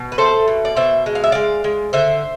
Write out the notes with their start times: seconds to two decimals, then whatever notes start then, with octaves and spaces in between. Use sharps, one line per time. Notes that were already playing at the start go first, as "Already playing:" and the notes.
Already playing: B2
0.12 B4
0.18 A3 A4 C5
0.48 B2
0.65 D5
0.76 B2 C5 E5
1.06 G#3
1.15 F5
1.24 E5
1.32 G#3 D5 F5
1.64 G#3
1.93 D3 C5 E5